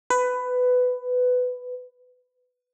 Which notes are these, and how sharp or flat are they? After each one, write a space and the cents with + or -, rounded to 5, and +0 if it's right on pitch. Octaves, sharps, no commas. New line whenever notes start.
B4 +15